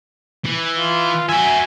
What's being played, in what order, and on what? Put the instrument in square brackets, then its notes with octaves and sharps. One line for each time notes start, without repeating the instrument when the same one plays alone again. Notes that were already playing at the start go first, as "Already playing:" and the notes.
[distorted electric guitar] E3
[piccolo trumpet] F4
[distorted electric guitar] F#4 E5 [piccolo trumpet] G#5